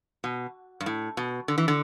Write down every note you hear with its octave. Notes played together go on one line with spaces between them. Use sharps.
B2
G2
A2
B2
D3
E3
D3